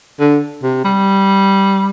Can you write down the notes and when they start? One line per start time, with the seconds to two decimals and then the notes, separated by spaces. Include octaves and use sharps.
0.20 D3
0.62 C3
0.84 G3